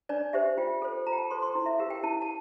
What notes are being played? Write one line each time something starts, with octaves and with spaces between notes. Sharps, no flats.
D4 D5
G4 C5 E5
F4 G5
A4 C5
F4 A#5
G5
A5
A4 C5 C6
C6
E4
E5
G4 A#4 F5
G5
E4 A5
A5